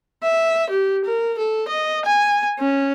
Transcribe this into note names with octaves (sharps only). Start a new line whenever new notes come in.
E5
G4
A#4
A4
D#5
G#5
C#4